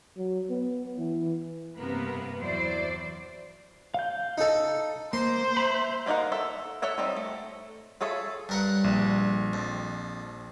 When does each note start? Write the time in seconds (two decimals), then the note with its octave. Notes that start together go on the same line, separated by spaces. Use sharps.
0.17 F#3
0.50 B3
0.98 E3
1.77 G2 C3 A#3 B3 A#4 B4
2.39 E2 F#3 E4 C5 D5
3.94 F5 G6
4.38 D#4 A4
5.13 A#3 C5 C6
5.57 E5 A#5 B5
6.06 A#3 C#4 D#4 A#4 F#5
6.32 A4 E5
6.82 A4 C#5 E5 F#5
6.98 G3 C4 D#4
7.16 A3
8.01 F4 G#4 A4 C#5 E5
8.49 G2 A#4 F#5
8.84 A#1
9.53 F2